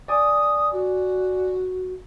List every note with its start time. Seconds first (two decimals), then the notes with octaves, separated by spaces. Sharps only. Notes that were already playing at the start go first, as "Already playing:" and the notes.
0.08 D5 G#5 D#6
0.72 F#4